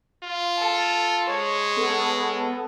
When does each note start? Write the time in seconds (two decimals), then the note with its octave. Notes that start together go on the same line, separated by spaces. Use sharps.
0.23 F4
0.59 A4
1.30 G#3 C#5
1.77 B3 A4